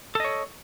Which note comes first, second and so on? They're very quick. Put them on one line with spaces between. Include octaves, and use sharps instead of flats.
A4 D#5 C#5